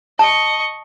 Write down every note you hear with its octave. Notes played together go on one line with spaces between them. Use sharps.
D#5 A5 C#6